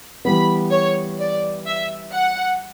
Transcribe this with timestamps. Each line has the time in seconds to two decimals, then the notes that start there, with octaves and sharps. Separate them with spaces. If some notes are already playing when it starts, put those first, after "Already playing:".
0.25 E3 G3 B3 B5
0.72 C#5
1.20 D5
1.66 E5
2.13 F#5